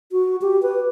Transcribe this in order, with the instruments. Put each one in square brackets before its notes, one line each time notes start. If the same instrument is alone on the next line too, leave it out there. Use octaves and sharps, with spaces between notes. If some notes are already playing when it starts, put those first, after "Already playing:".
[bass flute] F#4
G4
B4